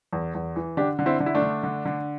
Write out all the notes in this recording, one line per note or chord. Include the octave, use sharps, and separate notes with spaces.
E2
E2
E3
D3 D4 G4
D3
C4 E4
D3
E4
A3 D4
D3
D3
D3